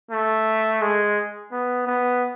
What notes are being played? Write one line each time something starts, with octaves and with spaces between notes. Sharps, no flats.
A3
G#3
B3
B3